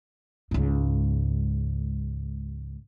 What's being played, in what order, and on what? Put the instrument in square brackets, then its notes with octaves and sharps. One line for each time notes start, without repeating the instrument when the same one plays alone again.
[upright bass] C#2 G#2